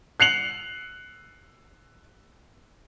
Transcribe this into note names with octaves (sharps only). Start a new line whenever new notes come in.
F#6 C7 C#7 F7 F#7